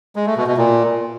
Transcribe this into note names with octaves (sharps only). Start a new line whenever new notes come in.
G#3
A3
B2
B2
A#2